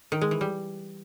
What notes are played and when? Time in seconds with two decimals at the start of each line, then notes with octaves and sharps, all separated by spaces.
0.12 D#3
0.21 G#3
0.31 E3
0.41 G3